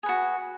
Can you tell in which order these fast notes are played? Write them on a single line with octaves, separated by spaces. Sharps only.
G#4 B4 F#4